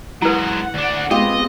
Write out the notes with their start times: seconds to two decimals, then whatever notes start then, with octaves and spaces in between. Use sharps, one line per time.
0.22 F#3 G#3 E4 B4 F#5
0.74 D2 D4
1.11 G#3 B3 C4 F4 G4 D#5